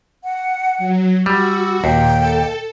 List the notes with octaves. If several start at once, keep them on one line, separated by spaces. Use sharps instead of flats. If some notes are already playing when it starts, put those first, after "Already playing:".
F#5
F#3
G3 F#4 E6
D#2 A#2 G5
A4